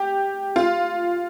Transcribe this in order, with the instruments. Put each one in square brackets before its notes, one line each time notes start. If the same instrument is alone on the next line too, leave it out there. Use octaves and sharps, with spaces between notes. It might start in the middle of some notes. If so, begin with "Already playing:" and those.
Already playing: [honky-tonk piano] G4
F4